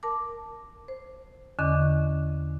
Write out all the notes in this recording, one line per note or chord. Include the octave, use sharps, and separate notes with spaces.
A#4 A5 D6
C5
E2 D3 C#4 D#5 D6